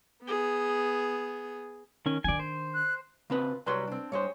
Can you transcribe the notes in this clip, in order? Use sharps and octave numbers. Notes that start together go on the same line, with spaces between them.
B3 G#4
D#3 C#4
D#3 D4 D5 G#5
C5
F#6
C#3 C4 F4 B4
C2 F#3 G3 B4 C6
C4 D4
G2 G#3 C5 C#5